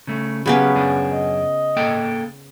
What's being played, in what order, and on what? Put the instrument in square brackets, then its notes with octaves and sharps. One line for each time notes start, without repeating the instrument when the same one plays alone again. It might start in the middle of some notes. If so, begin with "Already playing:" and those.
[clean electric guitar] C#3 A3
[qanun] C#3 B3 C#4 [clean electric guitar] F#3 G4 G#4 [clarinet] B5
[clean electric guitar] F#2 D4 G#4
[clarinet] D#5
[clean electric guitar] A#3 A4 G5